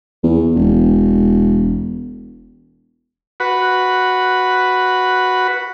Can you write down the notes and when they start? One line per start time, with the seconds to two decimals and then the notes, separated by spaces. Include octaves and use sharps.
0.23 E2
0.56 E1
3.40 F#4 B4